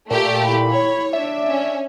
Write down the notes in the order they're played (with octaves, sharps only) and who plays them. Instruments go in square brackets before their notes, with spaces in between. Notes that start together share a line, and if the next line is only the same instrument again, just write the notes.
[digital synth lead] A#2 [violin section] A3 G4
[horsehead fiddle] E4 B5
[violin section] C#5
[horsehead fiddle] D4 D5 [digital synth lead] E5
[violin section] C#4 [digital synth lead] E5